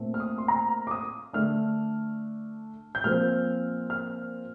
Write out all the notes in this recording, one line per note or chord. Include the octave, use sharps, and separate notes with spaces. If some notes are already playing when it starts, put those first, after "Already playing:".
Already playing: A#2 A3 C4
F6
D#6
C6
A#5
D6
D#6
D3 A3 D4 F6
G6
A#2 F3 C4 F6
F6